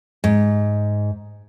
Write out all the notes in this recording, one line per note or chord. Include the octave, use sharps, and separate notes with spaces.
G#2